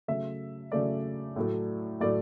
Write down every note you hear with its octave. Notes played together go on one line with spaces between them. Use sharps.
C#3 F#3 A3 E5
C#3 F#3 A3 D5
A2 F#3 A3
A2 F#3 A3 D5